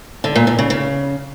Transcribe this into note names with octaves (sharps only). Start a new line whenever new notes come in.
D3
A#2
D3
C#3
C#3